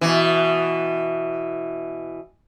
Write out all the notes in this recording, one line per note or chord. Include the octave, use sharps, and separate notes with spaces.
B2 E3